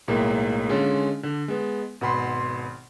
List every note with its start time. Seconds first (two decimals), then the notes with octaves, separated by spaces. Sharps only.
0.08 B1 A2 G#3 A#3
0.69 D3 G#3 C#4 F4
1.23 D3
1.48 G#3 B3
2.01 G#1 B2 F#5 B5 C6